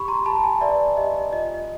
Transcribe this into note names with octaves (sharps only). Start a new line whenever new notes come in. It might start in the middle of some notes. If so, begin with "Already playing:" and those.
Already playing: G4 B5 C#6
A#5 C6
G4 A5 B5
G#5 A#5
B4 D5 E5
G4 D#5
F4 D#5